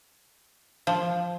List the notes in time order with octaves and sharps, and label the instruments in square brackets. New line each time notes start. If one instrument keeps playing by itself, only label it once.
[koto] F3